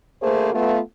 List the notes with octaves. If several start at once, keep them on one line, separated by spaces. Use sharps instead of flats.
D2 A3 A#3 G#4 C5
A3 B3 F4